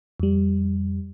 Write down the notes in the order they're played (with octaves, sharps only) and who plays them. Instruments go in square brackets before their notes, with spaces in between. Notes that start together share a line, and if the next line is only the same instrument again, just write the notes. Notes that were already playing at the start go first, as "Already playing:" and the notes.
[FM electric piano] F2 G3